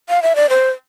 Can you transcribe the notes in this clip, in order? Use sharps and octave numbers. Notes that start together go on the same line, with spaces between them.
F5
E5
D5
C5